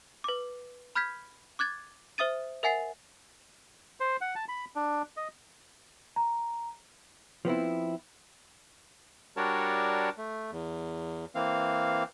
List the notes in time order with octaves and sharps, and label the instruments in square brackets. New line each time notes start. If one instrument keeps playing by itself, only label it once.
[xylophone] B4 D6
B5 F6 G6 G#6 B6
D6 F#6 G#6 A6
C5 E5 D#6 A6 D#7
A#4 E5 F#5 G#5 A6 C7
[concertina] C5
F#5
A5
B5
D4
D#5
[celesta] A#5
[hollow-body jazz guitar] F3 B3 C4 E4
[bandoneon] G3 D4 F#4 A#4 C#5 A5
A3
E2
E3 A#3 C4 F5